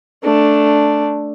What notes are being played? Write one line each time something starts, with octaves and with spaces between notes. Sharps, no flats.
A3 D4